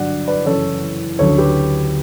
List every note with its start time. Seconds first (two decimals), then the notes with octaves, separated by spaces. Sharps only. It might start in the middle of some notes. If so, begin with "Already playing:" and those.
Already playing: G2 D3 F#3 D5 F#5
0.27 B4 D5
0.46 F#2 C#3 E3 A4 C#5
1.19 D2 C#3 F#3 A4 C#5
1.38 G4 B4